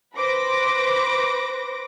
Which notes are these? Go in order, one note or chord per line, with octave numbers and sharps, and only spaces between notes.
B4 C5 D6 A#6